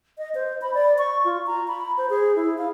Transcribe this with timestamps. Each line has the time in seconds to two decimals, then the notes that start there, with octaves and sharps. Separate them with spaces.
0.18 D#5
0.35 C5
0.62 B5
0.74 D5
0.98 C#6
1.25 F4
1.47 A#5
1.68 B5
1.97 C5
2.10 G#4
2.36 E4
2.58 F5